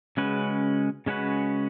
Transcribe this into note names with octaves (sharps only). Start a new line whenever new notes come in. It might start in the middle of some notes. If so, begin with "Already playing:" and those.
C#3 G#3 C#4 F#4 B4
C#3 G#3 C#4 F#4 B4